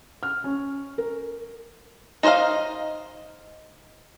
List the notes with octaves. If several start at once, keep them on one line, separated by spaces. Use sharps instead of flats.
F6
C#4
A#4
D#4 C5 C#5 D#5 F5